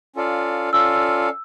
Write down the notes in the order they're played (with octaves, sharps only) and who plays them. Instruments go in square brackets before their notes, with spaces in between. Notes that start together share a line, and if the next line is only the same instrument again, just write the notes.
[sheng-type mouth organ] C#4 F4 A4 D5 F5
[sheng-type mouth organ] C#4 F4 A4 D5 F5 [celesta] E6